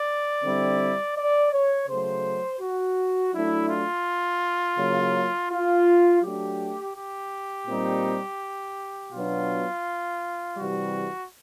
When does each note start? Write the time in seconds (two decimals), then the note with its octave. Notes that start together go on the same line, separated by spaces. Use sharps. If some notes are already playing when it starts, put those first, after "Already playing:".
Already playing: D5
0.44 D3 G3 C4 E4
1.16 D5
1.53 C#5
1.88 C#3 F#3 A3 C5
2.61 F#4
3.33 F#3 A3 D4 E4
3.70 F4
4.78 C#3 F#3 A#3
5.51 F4
6.23 F#3 A3 D4 G4
6.95 G4
7.68 A#2 G3 C4 D#4
9.12 B2 F#3 B3 D4 F4
10.57 C3 E3 G3 F#4